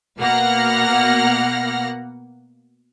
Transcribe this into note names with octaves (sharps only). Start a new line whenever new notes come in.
B2 A#3 F#5 F6 A#6